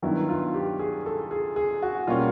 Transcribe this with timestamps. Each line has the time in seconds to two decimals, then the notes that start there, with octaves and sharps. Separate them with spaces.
0.02 G2 D#3 F#3 B3 E4
0.29 F4
0.54 G4
0.79 G#4
1.06 A4
1.31 G#4
1.56 G#4
1.82 F#4
2.07 B2 G3 A#3 C#4 F4